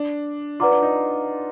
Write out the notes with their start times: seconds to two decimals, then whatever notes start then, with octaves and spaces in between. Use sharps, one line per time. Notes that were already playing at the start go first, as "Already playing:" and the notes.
Already playing: D4
0.60 F4 B4 D5 F#5 A#5 D6
0.72 D4
0.82 D#4